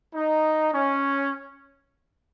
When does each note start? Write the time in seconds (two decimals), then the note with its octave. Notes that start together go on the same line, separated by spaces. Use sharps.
0.14 D#4
0.73 C#4